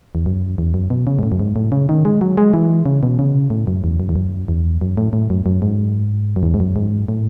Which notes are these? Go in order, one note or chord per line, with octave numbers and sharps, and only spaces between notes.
E2
F#2
E2
F#2
B2
C#3
G#2
A2
F#2
G#2
A2
C#3
D#3
G#3
F#3
G#3
E3
C#3
B2
C#3
A2
F#2
E2
F#2
E2
F#2
E2
F#2
A2
A2
F#2
F#2
G#2
F#2
E2
G#2
F#2
G#2
A2